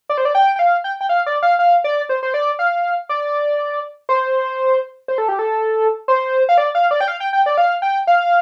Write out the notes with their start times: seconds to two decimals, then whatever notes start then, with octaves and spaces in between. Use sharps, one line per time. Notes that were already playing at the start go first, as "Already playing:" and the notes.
0.10 D5
0.18 C5
0.25 D5
0.35 G5
0.56 G5
0.59 F5
0.84 G5
1.01 G5
1.09 F5
1.26 D5
1.43 F5
1.59 F5
1.84 D5
2.09 C5
2.23 C5
2.34 D5
2.59 F5
3.09 D5
4.09 C5
5.08 C5
5.18 A4
5.28 G4
5.39 A4
6.08 C5
6.49 F5
6.58 D5
6.75 F5
6.91 D5
7.01 G5
7.08 F5
7.20 G5
7.33 G5
7.46 D5
7.58 F5
7.82 G5
8.07 F5